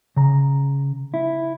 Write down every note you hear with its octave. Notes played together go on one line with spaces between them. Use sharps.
C#3 A#5
E4